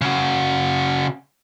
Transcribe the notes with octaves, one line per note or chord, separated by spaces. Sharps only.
C#3 F#4